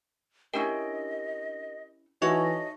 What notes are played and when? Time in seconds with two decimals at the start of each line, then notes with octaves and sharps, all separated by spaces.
0.54 C#4 D4 E4 G4 A#4 D#5 G5
2.22 E3 D#4 F#4 A4 C#5 D#5 E5 C#6